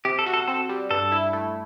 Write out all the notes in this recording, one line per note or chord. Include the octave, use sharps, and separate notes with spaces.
C3 G4
A4
F#4
A4
C4 A4
G3
G2 A4
E4
A3